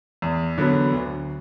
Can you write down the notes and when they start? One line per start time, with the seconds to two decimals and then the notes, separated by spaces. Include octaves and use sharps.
0.22 E2
0.58 D3 F#3 B3
0.93 D2